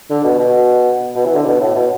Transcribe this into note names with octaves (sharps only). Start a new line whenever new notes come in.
D3
B2
B2
B2
E3
D3
B2
A2
B2